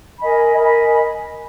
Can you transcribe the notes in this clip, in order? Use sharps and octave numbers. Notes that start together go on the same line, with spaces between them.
A#4 D#5 G#5 B5
A#4 D#5 G#5 B5